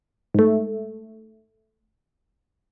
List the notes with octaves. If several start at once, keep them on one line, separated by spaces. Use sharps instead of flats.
G#2 A3